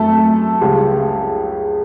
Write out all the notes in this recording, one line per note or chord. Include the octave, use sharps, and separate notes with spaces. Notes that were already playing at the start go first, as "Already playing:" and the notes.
Already playing: F#2 A3 A4
C#2 C#3 G3